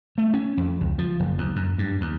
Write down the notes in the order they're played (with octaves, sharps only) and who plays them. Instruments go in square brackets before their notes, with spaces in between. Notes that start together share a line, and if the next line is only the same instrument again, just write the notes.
[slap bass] A3
C#4
F2
C#2
F3
F#1
D#2
F#2
G2
D#2